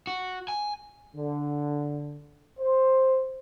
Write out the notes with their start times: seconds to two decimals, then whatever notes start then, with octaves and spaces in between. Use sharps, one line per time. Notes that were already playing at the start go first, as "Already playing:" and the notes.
0.07 F#4
0.48 G#5
1.16 D3
2.59 C5